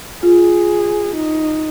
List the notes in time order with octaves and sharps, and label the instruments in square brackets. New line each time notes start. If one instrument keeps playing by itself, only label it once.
[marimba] F4 [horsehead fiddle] G#4
[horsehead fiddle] D#4